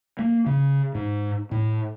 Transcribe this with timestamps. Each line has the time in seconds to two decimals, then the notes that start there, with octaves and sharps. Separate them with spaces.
0.19 A#3
0.46 C#3
0.95 G#2
1.51 A2